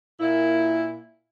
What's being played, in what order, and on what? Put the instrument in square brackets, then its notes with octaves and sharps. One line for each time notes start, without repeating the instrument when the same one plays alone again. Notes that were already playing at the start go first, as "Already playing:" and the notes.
[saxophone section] A#2 E4